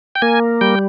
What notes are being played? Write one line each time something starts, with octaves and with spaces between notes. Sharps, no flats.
G5
A#3 G#5
G3 G5